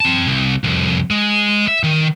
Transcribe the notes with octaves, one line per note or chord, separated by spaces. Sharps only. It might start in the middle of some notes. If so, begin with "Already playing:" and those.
C4 A5
C2
C2 F2
G#3
E5
D#3